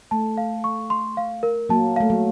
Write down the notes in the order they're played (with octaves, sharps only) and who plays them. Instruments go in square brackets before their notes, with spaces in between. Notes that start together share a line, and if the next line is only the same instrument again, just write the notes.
[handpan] A3 [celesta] A5
[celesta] F5
C#6
C6
F5
A#4
[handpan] F#3 A#3 [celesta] A5
[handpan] A3 [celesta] F5
[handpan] F#3